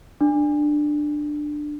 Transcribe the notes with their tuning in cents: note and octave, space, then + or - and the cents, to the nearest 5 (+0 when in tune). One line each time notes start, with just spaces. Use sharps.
D4 +15